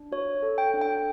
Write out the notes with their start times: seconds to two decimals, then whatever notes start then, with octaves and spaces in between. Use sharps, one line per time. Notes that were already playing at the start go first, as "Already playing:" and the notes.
Already playing: D4
0.12 F#4 C#5
0.43 A4
0.58 G5
0.74 D4
0.81 G5